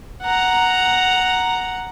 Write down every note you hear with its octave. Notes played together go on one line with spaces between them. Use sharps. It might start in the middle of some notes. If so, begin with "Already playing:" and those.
F#5 A#5